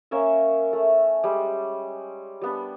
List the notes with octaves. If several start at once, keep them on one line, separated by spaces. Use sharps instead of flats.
A#3 C#4 A#4 E5
A3
G3 G#3
G3 B3 D4